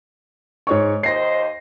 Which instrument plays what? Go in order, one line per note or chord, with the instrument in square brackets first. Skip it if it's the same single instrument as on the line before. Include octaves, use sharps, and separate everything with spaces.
[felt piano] G#2 C#5 C#6
[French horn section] D#2 C5 D#5 [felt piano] A#6 C7